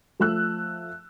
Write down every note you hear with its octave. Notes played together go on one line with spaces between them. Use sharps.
F3 A3 E6 F#6